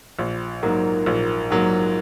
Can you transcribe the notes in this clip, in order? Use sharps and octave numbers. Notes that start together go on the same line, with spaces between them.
A#1
G#2 F#3 A#3
A#1
G#2 F#3 A#3